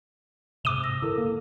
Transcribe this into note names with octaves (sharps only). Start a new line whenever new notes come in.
G#2 C3 D6 D#7 G7
D#6 E6 A#6
G#2 D3 D#3 E4 A4 A#4
A#3